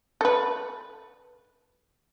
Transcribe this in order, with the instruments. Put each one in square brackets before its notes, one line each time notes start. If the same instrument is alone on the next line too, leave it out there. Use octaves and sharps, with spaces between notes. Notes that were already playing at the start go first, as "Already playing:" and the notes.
[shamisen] A4 B4